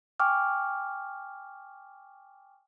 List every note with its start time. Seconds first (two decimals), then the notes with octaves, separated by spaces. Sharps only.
0.20 G5 G#5 C#6 D6 F6